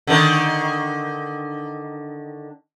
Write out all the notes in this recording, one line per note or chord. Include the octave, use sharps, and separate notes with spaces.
D3 D#3